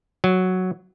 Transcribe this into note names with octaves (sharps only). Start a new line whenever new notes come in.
F#3